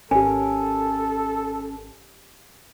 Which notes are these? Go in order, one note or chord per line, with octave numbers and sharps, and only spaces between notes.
G#1 C#4 G4 A4 A#4 C#5 G#5